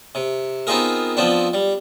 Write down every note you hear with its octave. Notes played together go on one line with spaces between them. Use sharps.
C3
B3 C4 D#4 F4 G#4 A#4
F3 B3 C4 D4
G3